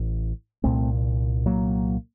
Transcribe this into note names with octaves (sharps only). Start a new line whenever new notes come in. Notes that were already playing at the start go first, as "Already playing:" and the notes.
Already playing: A1 A2
C2 A#2 A3 C4
F#3 A#3